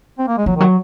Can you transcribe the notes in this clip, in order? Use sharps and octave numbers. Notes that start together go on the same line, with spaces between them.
C4
A#3
G#3
F3 F#3
D#3
F#3